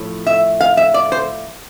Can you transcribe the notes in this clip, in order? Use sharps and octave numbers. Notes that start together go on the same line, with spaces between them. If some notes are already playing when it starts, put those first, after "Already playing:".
Already playing: A2 F3
E5
F5
E5
D5
C5